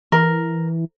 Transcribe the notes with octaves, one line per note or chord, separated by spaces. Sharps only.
E3 A#4